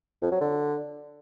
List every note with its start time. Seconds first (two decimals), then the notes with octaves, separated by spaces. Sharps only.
0.22 F2
0.32 F#3
0.41 D3